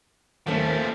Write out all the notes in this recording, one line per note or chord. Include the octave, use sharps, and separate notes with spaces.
D#2 F3 A3 A#3